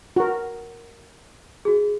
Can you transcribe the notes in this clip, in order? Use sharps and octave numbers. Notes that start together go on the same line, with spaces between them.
F#4 A#4
F#4 G#4